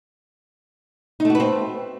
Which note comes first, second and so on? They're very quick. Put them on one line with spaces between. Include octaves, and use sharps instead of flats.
D#4 A3 F#4 B4 C4